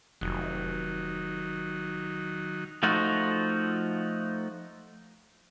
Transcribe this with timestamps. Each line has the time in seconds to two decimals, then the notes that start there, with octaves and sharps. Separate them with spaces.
0.21 F1 D#3 F#3
2.83 F3 A3 D#4 F4 F#4